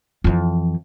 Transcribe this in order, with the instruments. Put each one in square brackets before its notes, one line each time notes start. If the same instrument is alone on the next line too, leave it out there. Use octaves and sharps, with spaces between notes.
[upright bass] F2 E3